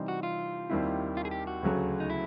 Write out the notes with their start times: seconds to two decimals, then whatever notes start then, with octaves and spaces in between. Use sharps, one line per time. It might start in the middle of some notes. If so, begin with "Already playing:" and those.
Already playing: C3 E3 G3 C4 D#4
0.08 F#4
0.23 F4
0.70 D#2 D#3 G3 C4 E4
1.17 F4
1.25 G#4
1.31 G4
1.47 F#4
1.63 D2 C#3 F#3 A3
2.00 D#4
2.10 E4